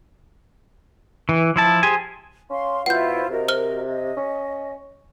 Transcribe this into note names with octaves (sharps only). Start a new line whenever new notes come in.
E3
F3 E4 A5
G4 G#4 C5 G#5
C#4 F5 C6
B2 E4 F4 C5 F#5 G6
C3 F#4 A#4 D#5
C5 F6 G7
D#5
C#4